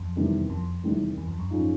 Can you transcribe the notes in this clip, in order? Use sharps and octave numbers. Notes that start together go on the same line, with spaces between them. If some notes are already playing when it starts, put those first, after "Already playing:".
Already playing: F2
E2 C3 D#3 G3 B3
F2
E2 C3 D#3 G3
E2
F2
F#2
G#2 F3 G#3 C#4